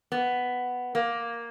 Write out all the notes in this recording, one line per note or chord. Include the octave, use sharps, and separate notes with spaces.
B3
A#3